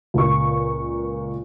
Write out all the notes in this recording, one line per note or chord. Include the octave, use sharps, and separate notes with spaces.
C#2 A#2 C#6